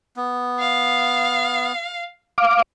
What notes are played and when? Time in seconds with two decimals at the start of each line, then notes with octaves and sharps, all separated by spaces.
0.16 B3
0.60 F5
2.38 F5 D6